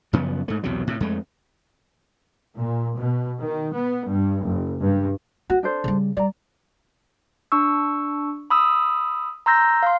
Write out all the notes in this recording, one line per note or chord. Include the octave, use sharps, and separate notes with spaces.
F#2 C#3 F3 B3
G#2 A3
B1 E2 C3 F#3
A2 C3
F2 G#3 A3
A#2
B2
D#3
B3
G2
F#1
G2
C4 F#4
D4 A4 C5
C#3 G3
G3 D5 A#5
D4 C#6 E6
B5 D#6 E6
A#5 C6 E6 G6 A#6
F5 C6